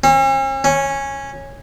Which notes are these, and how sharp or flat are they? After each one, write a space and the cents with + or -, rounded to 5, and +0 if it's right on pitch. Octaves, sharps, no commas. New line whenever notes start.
C#4 -45
C#4 -10